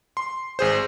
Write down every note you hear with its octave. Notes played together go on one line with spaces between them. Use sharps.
C6
G#1 G#4 C5